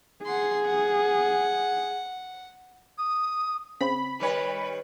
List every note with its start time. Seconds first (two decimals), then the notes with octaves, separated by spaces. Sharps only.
0.25 G#4 F#5 C6
0.65 F#5
2.98 D#6
3.81 C#3 C4 B5
4.20 D#3 G3 B4 C#5